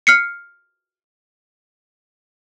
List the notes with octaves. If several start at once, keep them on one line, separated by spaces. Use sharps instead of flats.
F6 C7 C#7